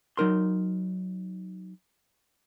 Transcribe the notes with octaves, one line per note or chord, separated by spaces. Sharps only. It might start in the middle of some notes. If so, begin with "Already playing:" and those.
F#3 D#4 A#4 C6